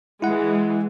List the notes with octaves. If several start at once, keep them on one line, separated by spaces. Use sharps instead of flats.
E3 G#3 E4 F#5